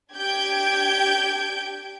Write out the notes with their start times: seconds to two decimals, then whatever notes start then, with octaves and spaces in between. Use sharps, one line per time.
0.13 D4 G4 G5 G6 G#6 D7